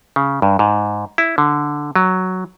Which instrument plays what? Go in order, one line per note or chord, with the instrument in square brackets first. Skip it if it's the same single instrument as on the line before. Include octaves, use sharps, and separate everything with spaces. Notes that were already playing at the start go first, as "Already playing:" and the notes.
[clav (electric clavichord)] C#3
G2
G#2
E4
D3
F#3